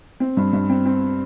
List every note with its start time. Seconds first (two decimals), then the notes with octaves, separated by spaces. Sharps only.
0.20 C4
0.37 G2
0.53 G2
0.70 C4
0.86 C4